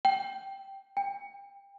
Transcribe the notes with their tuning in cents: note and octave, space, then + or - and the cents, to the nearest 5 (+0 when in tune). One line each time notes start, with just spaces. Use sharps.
G5 -5
G5 +25